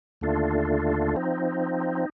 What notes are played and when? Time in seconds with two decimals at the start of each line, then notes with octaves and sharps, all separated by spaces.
0.21 D#2 D3 A3 D4 F4
1.16 F3 C4 D#4